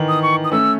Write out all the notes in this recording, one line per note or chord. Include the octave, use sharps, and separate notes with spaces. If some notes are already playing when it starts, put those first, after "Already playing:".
Already playing: D#3 E3
D#6
C#6
D#6
A3 C#4 E6